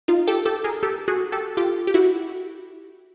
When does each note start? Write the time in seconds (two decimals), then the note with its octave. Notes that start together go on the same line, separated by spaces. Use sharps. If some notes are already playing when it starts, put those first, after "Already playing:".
0.08 D#4 F4
0.27 G4 A4
0.45 G4 A4
0.64 G#4 A#4
0.83 G4 A4
1.08 F#4 G#4
1.32 G4 A4
1.57 F4 G4
1.87 G4
1.94 E4 F#4